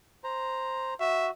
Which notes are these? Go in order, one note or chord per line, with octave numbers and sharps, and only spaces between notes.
C5 A#5
F#4 E5